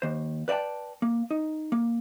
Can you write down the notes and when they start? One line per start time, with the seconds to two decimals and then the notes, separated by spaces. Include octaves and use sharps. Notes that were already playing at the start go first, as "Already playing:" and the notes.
0.02 D#2 C5
0.48 B4 D5 E5 G5 A5
1.02 A#3
1.31 D#4
1.72 A#3